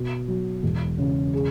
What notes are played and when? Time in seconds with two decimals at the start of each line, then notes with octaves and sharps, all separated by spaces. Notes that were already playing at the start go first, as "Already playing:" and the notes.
Already playing: B2
0.28 F#3
0.63 E1
0.98 C#3
1.33 G#4